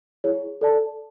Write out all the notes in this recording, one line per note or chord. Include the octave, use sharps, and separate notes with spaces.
E4 G#4 C#5
A4 D5 A5